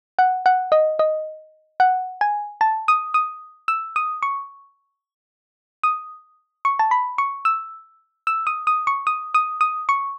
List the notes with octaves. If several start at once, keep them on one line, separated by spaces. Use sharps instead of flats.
F#5
F#5
D#5
D#5
F#5
G#5
A5
D#6
D#6
E6
D#6
C#6
D#6
C#6
A5
B5
C#6
E6
E6
D#6
D#6
C#6
D#6
D#6
D#6
C#6